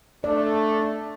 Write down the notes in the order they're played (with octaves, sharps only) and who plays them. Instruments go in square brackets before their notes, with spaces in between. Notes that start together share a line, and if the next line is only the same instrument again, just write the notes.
[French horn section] A3 [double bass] D4 [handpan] D5